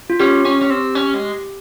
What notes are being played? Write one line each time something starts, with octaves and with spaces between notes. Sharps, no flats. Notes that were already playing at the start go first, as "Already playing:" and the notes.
F4
C#4 G4
C#4
C#4
C4
C#4
G#3